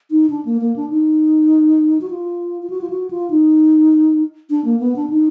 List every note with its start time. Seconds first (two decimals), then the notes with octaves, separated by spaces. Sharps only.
0.11 D#4
0.30 D4
0.45 A#3
0.61 A#3
0.76 D4
0.90 D#4
2.01 F#4
2.10 F4
2.62 F4
2.70 F#4
2.81 F4
2.90 F#4
3.11 F4
3.30 D#4
4.50 D4
4.65 A#3
4.80 B3
4.96 D4
5.10 D#4